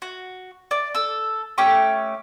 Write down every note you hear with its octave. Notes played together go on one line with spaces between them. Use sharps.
F#4
D5
A4 E6
A3 C#4 G4 C#6